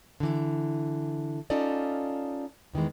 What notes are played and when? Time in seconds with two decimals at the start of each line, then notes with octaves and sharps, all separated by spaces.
0.20 D3 E3
1.50 C#4 D#4 F4 A4 D5 D#5
2.73 E2 D#3 E3 G#3